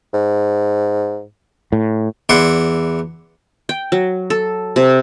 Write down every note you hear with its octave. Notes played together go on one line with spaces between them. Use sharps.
G#2
A2
E2 E4 D5 F#5 C6
G5
F#3
A4
C3